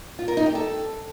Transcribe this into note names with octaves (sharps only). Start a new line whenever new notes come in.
F4
A#4
D#4
G4
A4